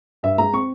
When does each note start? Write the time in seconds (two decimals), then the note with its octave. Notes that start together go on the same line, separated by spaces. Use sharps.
0.23 G2 E5
0.38 G#3 A#5
0.53 C4 C#6